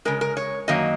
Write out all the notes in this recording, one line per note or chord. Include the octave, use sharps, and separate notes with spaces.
C#3 G#3 A#4
A#4
C#5
F#2 D#3 F#3 A#3 D#5